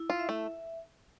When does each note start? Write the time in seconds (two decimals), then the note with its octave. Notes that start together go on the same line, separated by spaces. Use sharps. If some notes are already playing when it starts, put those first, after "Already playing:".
Already playing: E4
0.10 F4
0.19 E5
0.29 A3